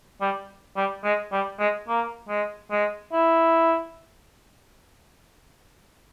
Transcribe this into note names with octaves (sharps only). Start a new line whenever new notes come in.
G3
G3
G#3
G3
G#3
A#3
G#3
G#3
E4